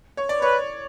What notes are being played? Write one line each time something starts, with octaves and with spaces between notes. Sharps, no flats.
C#5
D5
B4 C#5